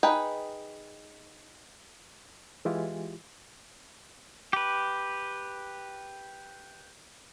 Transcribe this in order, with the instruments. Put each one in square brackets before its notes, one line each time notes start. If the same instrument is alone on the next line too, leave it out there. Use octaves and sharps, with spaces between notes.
[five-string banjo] D#4 G#4 B4 G5
[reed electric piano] E3 G#3 E4 F4 G4
[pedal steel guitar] G4 B4